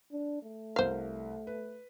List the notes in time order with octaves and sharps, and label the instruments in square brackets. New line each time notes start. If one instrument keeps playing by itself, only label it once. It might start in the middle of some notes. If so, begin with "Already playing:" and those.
[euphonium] D4
A3
[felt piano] C2 A#4 [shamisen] C5 F5
[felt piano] B4